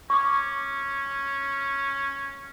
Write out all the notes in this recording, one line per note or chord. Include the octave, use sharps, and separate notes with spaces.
C#4 C#6 D6